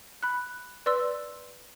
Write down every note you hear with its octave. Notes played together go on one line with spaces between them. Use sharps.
B5 F#6
B4 D5 C6 E6